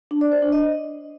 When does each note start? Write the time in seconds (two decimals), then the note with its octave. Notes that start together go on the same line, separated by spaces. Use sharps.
0.11 D4
0.21 D5
0.32 C5
0.42 D4
0.52 D#5